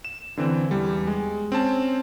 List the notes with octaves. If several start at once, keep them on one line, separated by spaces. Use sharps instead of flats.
E7
D3 E3 C4
E2 G3
G#3
C4 C#4 A5